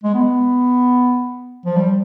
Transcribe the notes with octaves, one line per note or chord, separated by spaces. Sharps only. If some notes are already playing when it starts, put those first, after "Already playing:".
G#3
B3
F3
G3